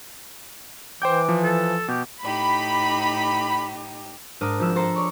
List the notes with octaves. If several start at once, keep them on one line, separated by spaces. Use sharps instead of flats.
E3 C5 G5 D6 G6
F3
A4
B2 G4
A2 D#4 G4 B5
G#2 D4 A#4 A5 D#6 F6
G#1 F3 E6
A4 C5 A5 A#5 C6
C#5 D5 C#6